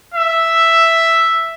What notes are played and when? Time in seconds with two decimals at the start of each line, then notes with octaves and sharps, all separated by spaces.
0.14 E5